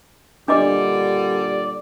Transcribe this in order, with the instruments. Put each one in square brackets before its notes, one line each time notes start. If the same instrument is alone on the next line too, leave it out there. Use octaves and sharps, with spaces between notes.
[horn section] A#2 D3 G3 [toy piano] D4 D#5 D6 [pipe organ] D5